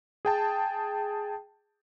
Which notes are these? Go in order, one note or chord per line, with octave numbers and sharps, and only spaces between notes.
G#4 G5 A5